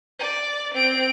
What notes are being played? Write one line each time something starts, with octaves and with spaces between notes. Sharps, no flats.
D5
C4 D7